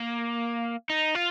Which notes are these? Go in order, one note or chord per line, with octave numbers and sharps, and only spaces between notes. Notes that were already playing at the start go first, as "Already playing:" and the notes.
Already playing: A#3
D#4
F4